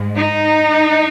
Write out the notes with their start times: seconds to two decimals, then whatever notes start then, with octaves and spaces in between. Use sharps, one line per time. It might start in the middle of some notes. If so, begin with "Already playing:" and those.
Already playing: G#2 G#3
0.16 D#4